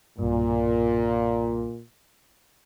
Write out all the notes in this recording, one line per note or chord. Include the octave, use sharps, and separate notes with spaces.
B1 G2 A#2